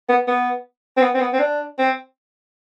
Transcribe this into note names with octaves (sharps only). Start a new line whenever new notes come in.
B3
B3
C4
B3
C4
B3
C4
D4
C4